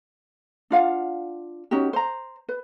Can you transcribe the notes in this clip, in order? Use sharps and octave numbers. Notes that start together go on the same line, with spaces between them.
D4 F4 F5 F#5
C#4 D#4 F#4 G4
C5 A#5
B4